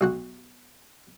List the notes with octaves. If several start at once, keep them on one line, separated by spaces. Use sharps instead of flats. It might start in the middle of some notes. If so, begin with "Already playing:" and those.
B1 F#4 F#5